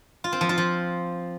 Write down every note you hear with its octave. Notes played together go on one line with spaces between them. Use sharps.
F4
C4
F3
F4
F3